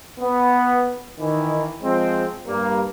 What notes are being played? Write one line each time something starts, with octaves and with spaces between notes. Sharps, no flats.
B3
D#3 E3
F3 G#3 C4
G2 G3 A#3